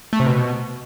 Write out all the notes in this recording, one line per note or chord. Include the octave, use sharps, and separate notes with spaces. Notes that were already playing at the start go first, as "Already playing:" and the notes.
A3
C3
B2